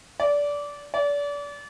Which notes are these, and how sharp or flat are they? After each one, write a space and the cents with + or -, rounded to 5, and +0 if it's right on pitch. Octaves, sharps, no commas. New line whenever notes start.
D5 -20
D5 -35